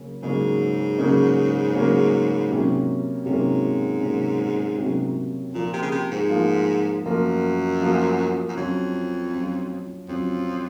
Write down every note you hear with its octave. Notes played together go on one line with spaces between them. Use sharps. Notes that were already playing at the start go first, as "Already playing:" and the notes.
Already playing: C#3 F#3 A#3 C#4
G#2 C#3 F#3 A#3 C#4
C#3 F#3 A#3 C#4
C#3 F#3 A#3 C#4
C3 F#3 A#3 C#4
G#2 C3 F#3 A#3 C#4
C3 F#3 A#3 C#4
C3 F#3 A#3 C#4
A#2 F3 A#3 F4
C3
C#3
C3
G#2
F3 A#3 F4
F#2 F3 A#3 F4
F3 A#3 F4
F#2
F2 F#3 C#4 F4
F#3 C#4 F4
F2 F#3 C#4 F4